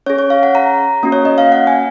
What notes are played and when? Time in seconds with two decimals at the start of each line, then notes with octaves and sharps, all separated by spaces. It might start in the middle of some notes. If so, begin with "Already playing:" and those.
0.06 C#4 G#4 C#5
0.18 C#5
0.30 F5
0.43 F#5
0.55 A#5
1.03 A#3 C#4 F#4
1.12 C#5
1.25 D#5
1.38 F5
1.52 F#5
1.67 G#5